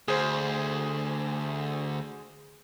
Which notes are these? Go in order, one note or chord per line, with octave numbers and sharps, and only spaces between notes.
D2 G#4 C5